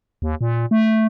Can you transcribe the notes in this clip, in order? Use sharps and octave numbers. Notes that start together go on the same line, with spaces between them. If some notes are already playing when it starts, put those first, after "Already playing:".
D#2
A#2
A3